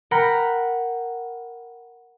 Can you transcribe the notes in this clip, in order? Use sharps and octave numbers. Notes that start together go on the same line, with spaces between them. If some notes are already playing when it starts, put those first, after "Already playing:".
A#4 F#5 G5 A#5 B5